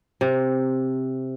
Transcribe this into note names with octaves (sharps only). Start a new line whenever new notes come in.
C3